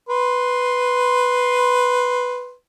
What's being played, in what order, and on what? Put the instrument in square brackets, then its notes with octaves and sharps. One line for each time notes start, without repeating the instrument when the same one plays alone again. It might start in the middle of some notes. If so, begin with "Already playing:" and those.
[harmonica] B4 C6